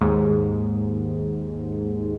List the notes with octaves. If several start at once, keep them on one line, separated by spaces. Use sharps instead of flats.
D#2 G#2